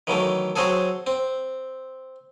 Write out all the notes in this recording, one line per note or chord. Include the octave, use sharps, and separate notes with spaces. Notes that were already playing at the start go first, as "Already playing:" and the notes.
D#3 E3 F#3 A3
F#3 C4 F#4 G#4 A4
C4